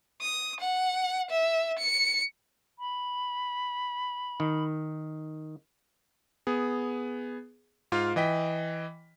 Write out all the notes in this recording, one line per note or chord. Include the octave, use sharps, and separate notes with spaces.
D#6
F#5
E5
C#7
B5
D#3
B3 G#4
G#2 F4 F5
E3 D#5 G5 B6